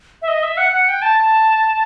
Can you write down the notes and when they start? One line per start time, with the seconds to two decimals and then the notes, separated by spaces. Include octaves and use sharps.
0.22 E5
0.28 D#5
0.43 E5
0.57 F#5
0.72 F#5
0.88 G5
1.02 A5